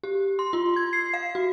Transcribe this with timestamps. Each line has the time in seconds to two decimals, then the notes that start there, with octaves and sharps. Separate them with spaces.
0.03 G4
0.39 C6
0.53 F4
0.76 G#6
0.93 C7
1.14 F5
1.35 F#4